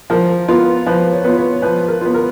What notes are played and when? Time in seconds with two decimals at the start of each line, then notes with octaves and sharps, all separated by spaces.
0.10 F3 A#4
0.48 B3 F4
0.87 F3 B4
1.13 C#5
1.24 B3 F4
1.38 C#5
1.62 F3 B4
1.88 A#4
2.01 B3 F4
2.14 A#4